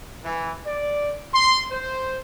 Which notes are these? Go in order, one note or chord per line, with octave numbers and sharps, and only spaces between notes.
E3
D5
C6
C5